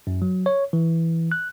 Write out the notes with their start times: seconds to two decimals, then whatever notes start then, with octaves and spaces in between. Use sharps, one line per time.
0.07 F#2
0.22 F#3
0.46 C#5
0.73 E3
1.32 F#6